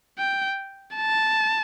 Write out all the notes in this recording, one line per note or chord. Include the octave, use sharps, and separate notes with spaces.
G5
A5